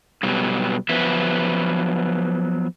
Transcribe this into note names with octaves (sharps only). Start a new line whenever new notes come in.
B2 F#3 G3
F3 F#3 B3 B4 E5